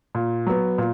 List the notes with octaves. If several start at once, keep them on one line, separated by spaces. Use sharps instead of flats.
A#2
F#3 B3
A#2